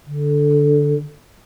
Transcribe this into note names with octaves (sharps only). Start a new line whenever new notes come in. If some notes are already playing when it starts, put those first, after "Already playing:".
D3